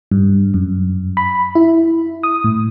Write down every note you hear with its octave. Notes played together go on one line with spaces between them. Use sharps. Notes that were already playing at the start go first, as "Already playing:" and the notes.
G2
F#2
B5
E4
D#6
A2